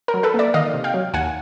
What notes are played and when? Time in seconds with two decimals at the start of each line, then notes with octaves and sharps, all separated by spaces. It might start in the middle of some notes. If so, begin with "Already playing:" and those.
0.08 A#4
0.14 F#3
0.23 A4 B4
0.34 A#3 D5 E5
0.54 D#3 D#5 F5
0.74 C3
0.84 F5 G5
0.94 F#3
1.14 D#2 F#5 G#5